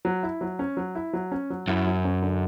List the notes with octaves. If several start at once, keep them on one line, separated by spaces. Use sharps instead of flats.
F#3
E4
F#3
C#4
F#3
E4
F#3
C#4
F#3
F#2 E4
F#3
C#4
D3